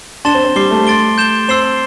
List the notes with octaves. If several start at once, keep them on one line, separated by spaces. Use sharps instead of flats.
D4 A5 C6 A6 E7 G7
C4
C4
G3 D6 C7 G7
A3
C6 A6 D7 G7
G6 E7 G7
C4 C6 E6 C7 E7 G7